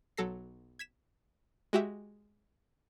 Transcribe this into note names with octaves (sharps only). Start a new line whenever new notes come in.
B1 F#3 A4 A#6 C7
G#6 B6 E7
G#3 F#4 G4 E5